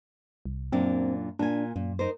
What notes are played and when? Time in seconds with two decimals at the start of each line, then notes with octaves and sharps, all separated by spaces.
0.46 C2
0.72 F#2 A#2 C4 D4
1.39 A#2 D4 G#5
1.76 F#2 A#2
1.99 D#4 A#4 C5